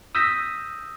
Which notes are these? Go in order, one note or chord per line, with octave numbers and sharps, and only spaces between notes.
D#6 E6 G6 A#6 B6